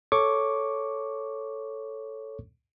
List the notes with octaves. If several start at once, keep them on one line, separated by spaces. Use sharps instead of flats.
A4 C#5 C#6 D6